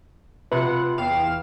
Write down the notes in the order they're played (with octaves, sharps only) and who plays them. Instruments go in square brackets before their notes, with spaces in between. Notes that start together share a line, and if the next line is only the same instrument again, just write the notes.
[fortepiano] C3 [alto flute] F4 [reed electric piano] B4 [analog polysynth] F#5
[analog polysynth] E2 F5 E7 [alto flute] G5